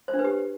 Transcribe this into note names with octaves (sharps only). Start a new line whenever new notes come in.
C5
D4
B4
G4